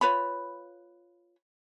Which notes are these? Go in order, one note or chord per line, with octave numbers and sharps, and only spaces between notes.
F4 B4 C#5 B5